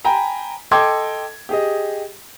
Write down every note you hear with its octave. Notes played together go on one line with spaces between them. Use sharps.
G5 G#5 A#5 B5
A4 D#5 G5 C6 D6 G#6
G4 G#4 D#5